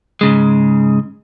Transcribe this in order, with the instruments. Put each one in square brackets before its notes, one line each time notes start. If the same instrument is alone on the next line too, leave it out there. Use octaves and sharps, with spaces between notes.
[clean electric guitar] G#2 C#3 G#3